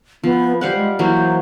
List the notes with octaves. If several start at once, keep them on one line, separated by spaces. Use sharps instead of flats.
F3 B3
G3 C5 F5 F#5
G#3
E3 F#3 A#3 C5